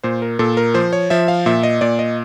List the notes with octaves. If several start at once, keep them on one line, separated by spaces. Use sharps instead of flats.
A#2 C5
A#4
A#2 A4
A#4
F3 C5
C#5
F3 E5
F5
A#2 E5
D#5
A#2 D5
D#5